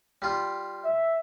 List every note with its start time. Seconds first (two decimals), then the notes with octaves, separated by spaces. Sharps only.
0.22 G3 F4
0.84 E5